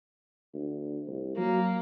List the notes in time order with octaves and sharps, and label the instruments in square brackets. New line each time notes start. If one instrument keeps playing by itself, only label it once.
[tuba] D2
C2
[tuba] F#3 [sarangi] A#3